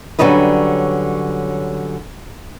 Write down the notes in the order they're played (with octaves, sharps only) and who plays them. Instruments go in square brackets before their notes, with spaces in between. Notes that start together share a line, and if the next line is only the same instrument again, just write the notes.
[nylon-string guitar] D3 F#3 G3 C#4 D#4 B4